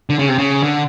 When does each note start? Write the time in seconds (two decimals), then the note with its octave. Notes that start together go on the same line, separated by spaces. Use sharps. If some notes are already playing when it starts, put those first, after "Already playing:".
0.10 D3
0.19 C#3
0.28 C3
0.38 C#3
0.63 D3